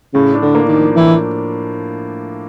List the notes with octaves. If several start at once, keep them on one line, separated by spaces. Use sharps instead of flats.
A2 C#3
D4
D3
A#3
D#3
F3
A2 E3